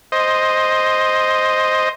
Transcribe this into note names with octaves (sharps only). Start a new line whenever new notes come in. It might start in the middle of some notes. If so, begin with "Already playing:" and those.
C5 D#5